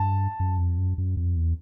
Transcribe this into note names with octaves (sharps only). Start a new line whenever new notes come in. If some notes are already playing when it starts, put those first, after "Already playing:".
Already playing: G2 A5
F#2
F2
F#2
F#2
F2
E2